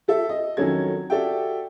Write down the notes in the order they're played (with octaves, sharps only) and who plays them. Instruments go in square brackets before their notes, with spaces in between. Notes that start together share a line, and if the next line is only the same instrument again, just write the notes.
[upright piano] G4 A4 E5
D#5
F2 D#3 F#3 C#4 A4 G#6
F#4 G4 A4 D5 E5 G5